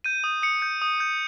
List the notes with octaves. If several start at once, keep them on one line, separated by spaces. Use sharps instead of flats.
G6 D#7
D#6
D#6 C#7
G6
D#6
G6